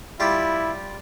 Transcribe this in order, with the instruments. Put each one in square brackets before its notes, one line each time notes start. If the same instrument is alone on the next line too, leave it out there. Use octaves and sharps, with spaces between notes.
[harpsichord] G3 F4 G4 [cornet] E4